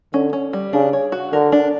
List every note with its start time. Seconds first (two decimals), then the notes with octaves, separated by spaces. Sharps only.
0.14 D3 C#4
0.33 C#4
0.53 G3
0.73 C#3 D4
0.93 C#5
1.12 F#4
1.33 D3 A#4
1.52 D4